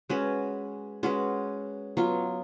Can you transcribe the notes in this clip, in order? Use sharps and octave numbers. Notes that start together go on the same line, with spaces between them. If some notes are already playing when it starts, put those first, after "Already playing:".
G#3 C#4 F#4 B4
G#3 C#4 F#4 B4
F#3 B3 F4